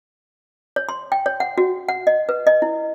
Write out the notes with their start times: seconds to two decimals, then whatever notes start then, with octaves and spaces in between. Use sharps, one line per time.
0.76 C#5
0.89 C6
1.12 G5
1.26 C#5
1.40 F#5
1.58 F#4
1.89 F#5
2.07 D#5
2.29 B4
2.47 D#5
2.62 E4